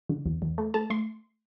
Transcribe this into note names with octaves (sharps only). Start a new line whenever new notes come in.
D3
E2
E2
A3
A3 A5
A3 C6